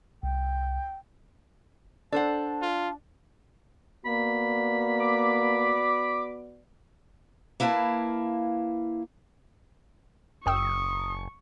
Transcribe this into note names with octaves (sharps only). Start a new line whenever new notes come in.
C2 G5
D4 A4 C5 F#5 A5
F4
A#3 B3 F#4 D5 B5
D6
A#3 E4 B4 F5 A5
F#1 F#2 G5 C#6 D#6 E6